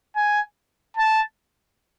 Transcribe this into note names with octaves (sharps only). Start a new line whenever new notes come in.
G#5
A5